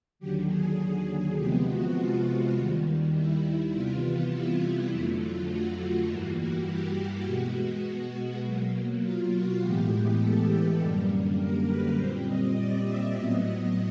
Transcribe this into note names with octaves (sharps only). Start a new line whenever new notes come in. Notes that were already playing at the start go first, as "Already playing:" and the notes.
D#2 D3 F#3 G4
G#4
C3 F3 G#3 B3 G4
F#4
F4
D#2 D#3 G3
E4
C3 E3 G3 B3 F4
E4
F4
F2 D3 F#3 A3 E4
F4
F#4
G2 E3 G3 A#3 E4
F#4
G4
B2 G#3 B3 F#4
F#4
B2 F#3 A#3
F4
F#4
A2 E3 G#3 B3 G4
A4
F#2 D3 G3 A#3
A#4
B4
A#2 G3 C4 C5
D#5
D5
E5
A2 F#3 B3 D#5